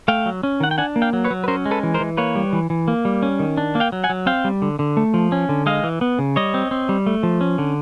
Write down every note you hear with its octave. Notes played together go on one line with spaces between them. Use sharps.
A3 F5 G5
F#3
C#4
D#3 F#5
G5
D4 F#5 G#5
A#3
F5 G5
F#3
B4 C#5
F#3
B4
C#4 A#4 C5
G#3
A4 B4
E3
A#4 C5
E3
A#3 B4 C#5
G3
E3
E3
A#3
G3
C#4
D#3
D4
A#3
F5 G5
F#3
F#5 G#5
F#3
C4 F5 G5
G3
D3
D3
A3
F3
C#4
D3
G#3 D#5 F5
E3
B3
C#3
G3 C#5 D#5
C4
C4
G3
A3
F3
C#4
D3